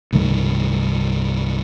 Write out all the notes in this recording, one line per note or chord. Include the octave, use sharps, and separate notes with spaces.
C2 G2 D#3 A3